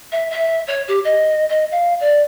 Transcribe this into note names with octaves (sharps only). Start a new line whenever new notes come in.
E5
E5
C#5
G4
D#5
D#5
F5
D5